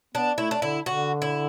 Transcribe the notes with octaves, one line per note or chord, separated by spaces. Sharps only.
B3 D4
A3 E4
D4
D3 E4
D3 F#4
E4